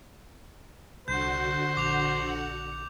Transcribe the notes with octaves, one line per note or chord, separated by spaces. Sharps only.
C2 D3 F#4 C5 F#5 G6
A#1 D6 F7